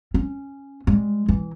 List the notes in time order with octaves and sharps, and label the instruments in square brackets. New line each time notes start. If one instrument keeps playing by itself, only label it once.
[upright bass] C#4
G3 G#3
E3